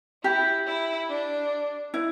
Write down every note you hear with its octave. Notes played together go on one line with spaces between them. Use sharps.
E4 G4
E4
D4
E4